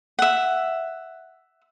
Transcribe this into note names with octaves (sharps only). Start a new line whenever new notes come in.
E5 F#5